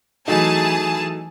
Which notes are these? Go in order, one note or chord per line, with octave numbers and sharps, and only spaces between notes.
E3 F#3 A3 D#4 G#4 A5